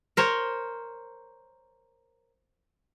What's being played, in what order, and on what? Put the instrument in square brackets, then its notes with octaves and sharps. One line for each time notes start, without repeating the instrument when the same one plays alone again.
[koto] A#4 C5 C#5